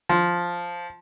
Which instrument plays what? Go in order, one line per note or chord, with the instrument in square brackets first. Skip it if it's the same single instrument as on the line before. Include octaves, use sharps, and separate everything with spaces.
[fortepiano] F3